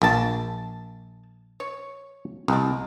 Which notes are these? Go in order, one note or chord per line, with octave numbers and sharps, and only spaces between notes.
A#1 A#4 G5 A5
C#5
C2 D5 D#5